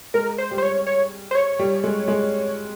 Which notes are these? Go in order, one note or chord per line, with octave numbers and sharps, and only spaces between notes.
G#3 A#4
C5
G3
C5
C#5
C#5
C5
C#5
G3
G#3
G#3